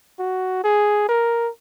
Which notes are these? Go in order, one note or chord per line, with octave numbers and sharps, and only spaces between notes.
F#4
G#4
A#4